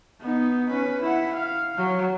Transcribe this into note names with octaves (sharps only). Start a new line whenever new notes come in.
B3 D#4
C#4 B4
E4 F#5
F5
F#3